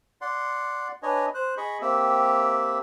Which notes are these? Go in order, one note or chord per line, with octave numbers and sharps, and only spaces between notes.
D5 F#5 C6
D4 B4 C#5 D#5 G#5
C5 F#6
G#4 D#5 B5 C#6
A#3 C4 G4 E5